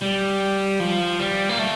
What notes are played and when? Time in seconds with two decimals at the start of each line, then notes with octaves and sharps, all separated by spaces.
0.02 G3
0.80 F3
1.20 G3
1.49 A#3
1.58 A3